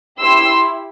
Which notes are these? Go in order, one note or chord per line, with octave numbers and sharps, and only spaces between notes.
E4 G4 C6 E6